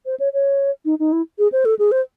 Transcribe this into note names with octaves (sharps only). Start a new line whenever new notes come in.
C5
C#5
C#5
D#4
D#4
E4
G#4
C5
A4
G#4
C5